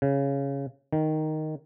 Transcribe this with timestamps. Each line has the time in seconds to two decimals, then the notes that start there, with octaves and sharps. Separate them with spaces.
0.02 C#3
0.93 D#3